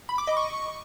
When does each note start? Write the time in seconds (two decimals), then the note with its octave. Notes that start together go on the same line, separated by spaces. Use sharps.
0.09 B5
0.18 D6
0.27 D#5
0.37 C#6